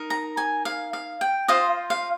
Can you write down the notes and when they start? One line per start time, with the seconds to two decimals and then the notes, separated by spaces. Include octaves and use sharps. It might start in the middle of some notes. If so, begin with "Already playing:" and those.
Already playing: D#4 A#4
0.10 A#5
0.37 G#5
0.65 F5
0.93 F5
1.21 G5
1.48 F4 C5 D#5 F5
1.90 F5